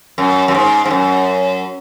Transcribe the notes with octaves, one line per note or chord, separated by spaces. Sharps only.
F#2
F#2
G#2
G#2
F#2